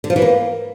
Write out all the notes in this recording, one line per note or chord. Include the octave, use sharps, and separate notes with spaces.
D3
F3
E3
A#3